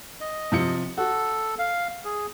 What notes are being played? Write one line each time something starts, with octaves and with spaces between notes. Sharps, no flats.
D#5
C3 F3 C#7
F#4 A4
F5
G#4